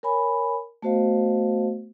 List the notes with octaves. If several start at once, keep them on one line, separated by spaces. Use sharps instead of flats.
A#4 C#5 G#5 B5
A3 B3 F#4 C5 D#5 F5